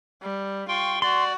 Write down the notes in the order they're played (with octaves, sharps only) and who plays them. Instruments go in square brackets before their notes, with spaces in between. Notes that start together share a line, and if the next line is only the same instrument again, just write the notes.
[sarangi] G3
[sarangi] F4 [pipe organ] G5 C6 C#6
[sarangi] F#4 [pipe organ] D5 [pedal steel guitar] C6